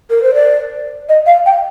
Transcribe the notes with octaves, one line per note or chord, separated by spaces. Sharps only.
A#4
C5
D5
D#5
F5
G5